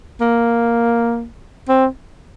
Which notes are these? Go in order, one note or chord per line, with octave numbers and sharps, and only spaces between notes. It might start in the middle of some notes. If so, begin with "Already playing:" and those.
A#3
C4